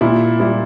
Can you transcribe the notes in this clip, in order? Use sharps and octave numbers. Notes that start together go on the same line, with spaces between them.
A#2 E4
G3 E4